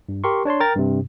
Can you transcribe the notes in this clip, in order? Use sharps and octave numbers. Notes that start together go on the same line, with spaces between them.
G2
G4 A#4 C6 C#6
D4 C#5 A5 C6
A#4 G5 A#5 F6 A6
G2 C3